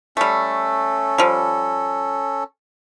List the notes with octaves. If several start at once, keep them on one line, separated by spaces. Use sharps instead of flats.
G3 A3 C#4 A4
F3 G3